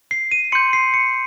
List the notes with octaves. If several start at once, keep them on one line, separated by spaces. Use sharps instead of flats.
C7
D#7
C6 G6 C#7
C7
C#7